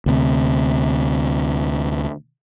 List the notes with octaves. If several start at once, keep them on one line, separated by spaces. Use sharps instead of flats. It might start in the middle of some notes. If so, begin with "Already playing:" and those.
D2 C3